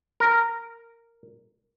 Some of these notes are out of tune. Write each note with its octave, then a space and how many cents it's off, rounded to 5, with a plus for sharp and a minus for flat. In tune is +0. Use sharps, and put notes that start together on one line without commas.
A#4 -10